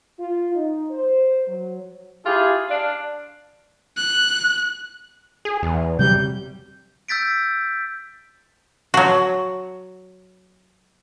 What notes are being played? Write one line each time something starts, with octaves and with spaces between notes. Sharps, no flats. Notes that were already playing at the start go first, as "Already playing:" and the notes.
F4
D#4
C5
F#3
E4 F4 G4 G#4
D4 F5
F#6
G#4
E2
C3 F#3 G3 G6
E6 G6 A6 B6 D7
F#3 F#4